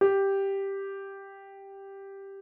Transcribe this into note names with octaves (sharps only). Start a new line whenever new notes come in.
G4